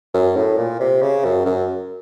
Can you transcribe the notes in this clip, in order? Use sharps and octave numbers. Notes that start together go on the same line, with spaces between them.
F#2
A2
A#2
C3
C#3
F#2
F#2